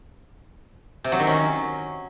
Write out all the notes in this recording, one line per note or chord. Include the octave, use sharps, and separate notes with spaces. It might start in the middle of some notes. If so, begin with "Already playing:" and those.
C3
F#3
D#3
C#4